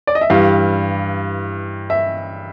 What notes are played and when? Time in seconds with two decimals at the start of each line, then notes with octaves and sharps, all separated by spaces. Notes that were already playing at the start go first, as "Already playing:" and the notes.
0.07 D5
0.15 D#5
0.21 E5
0.30 G2 E3 G3 F5
1.90 E5